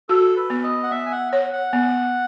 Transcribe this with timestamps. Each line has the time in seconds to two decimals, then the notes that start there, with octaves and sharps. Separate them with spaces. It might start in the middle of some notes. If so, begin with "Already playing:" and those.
0.09 F#4 A4
0.36 B4
0.50 B3
0.63 D#5
0.83 F#5
0.91 B3 E5
1.06 G#5
1.12 F#5
1.33 C#5 F#5
1.53 F#5
1.73 B3